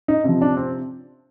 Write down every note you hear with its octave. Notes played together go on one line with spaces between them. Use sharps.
D#4
C3 F3
D4
C4